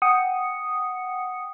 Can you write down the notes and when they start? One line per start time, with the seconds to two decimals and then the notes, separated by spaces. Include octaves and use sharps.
0.02 F#5 G5 D#6 C#7